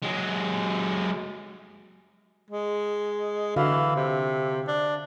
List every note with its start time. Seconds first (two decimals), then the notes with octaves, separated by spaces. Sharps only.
0.02 F#3 G#3
2.50 G#3
3.56 D3 E3 F#4 F5
3.96 C3
4.67 D4